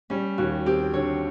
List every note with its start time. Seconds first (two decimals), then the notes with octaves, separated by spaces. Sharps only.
0.10 G3 C#4
0.38 D#2 F#4
0.66 C4 G4
0.93 D3 C#5